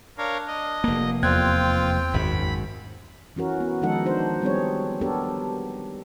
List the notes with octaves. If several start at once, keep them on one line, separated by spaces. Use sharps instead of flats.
D4 A#4 C#5 F5
D#5
F1 A#3
E2 C4 F4 G5 F#6 G#6
G#1 F#2 B5
E3 C#4 F#4 A#4
B3
D#3 F3 G#3 D#4 A4 F#5
D4 F#4 C5
G3 B3 C4 D4 G#4 C#5
B3 D4 G4 A4 A#4 C#5